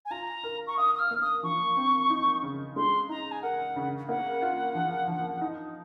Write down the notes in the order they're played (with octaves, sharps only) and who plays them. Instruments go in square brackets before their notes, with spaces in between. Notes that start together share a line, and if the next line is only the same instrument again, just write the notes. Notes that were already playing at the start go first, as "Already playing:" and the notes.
[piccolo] G#5
[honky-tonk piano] F4 [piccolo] A#5
[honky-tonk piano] A#4
[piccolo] C#6
[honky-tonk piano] F5 [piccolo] D#6
[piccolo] D#6
F6
[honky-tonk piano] A#3
[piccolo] D#6
[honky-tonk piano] F3 [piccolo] C#6
[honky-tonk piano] C4
D#4
C#3
[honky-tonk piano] G#3 [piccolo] C6
[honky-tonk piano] D#4 [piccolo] A#5
[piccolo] G#5
[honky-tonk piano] A#4 [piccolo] F#5
[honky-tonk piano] C#3
[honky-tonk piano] A#3 [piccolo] F#5
[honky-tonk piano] F4
F3
F3
D#4